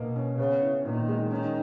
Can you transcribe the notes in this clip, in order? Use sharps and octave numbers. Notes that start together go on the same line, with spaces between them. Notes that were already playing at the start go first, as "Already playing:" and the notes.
Already playing: B2 A#3 D#5
C#4
C#3 B3
E4
A#2 D#3
G#3
D#3 C#4